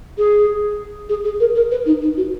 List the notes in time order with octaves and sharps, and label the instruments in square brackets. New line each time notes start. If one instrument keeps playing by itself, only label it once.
[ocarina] G#4
G#4
G#4
A#4
A#4
B4
D#4
D#4
F#4